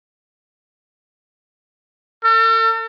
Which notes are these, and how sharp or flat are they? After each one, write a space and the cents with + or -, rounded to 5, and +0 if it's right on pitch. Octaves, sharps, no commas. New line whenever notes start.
A4 +45